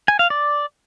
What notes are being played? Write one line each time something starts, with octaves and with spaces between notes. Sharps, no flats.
G#5
F5
D5